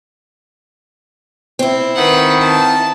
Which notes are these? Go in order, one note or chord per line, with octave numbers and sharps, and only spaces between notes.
C4 E4
D#3 B4 F#5
A5